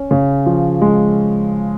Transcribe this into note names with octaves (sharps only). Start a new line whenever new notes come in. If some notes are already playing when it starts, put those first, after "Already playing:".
Already playing: C#4
C#3
F3
G#3